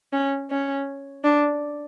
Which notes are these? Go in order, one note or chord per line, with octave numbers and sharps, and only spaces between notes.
C#4
C#4
D4